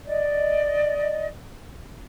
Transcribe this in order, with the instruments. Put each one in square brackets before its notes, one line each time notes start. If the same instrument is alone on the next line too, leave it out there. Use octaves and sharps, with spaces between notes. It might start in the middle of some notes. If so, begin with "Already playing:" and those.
[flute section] D5 D#5